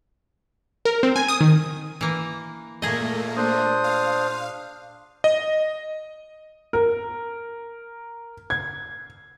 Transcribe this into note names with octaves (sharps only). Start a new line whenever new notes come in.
A#4
C4
G#5
D#6
D#3
E3 A#3
A#2 A3 A#3 G#4 D#5
D4 C5 D#6
F5
D#5
A#4
G#6